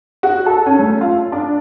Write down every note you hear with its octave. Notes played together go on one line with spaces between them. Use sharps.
F#4
A4
C#4
A3
F4
D4